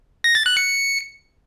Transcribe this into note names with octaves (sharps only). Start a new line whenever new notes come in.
A#6
A6
F#6
C#7